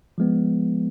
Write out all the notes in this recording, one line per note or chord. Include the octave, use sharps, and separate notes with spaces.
F3 G#3 B3